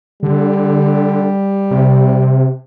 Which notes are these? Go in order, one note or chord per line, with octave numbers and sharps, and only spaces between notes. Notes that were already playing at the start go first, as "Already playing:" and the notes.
D3 G3
C3